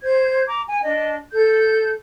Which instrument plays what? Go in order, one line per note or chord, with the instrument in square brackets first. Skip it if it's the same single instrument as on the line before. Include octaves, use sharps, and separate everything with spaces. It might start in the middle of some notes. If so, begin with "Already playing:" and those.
[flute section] C5 G6 G#6
A#5 D6
G#5
D4 D#5
A4 G6